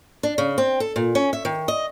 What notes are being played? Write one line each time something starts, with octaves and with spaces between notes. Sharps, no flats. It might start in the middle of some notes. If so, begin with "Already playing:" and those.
D4
C#3
C4
A4
A#2
C#4
E5
D#3
D#5